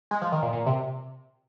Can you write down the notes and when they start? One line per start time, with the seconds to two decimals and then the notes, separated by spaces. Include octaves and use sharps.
0.11 G#3
0.22 F3
0.32 D#3
0.42 A#2
0.53 A#2
0.66 C3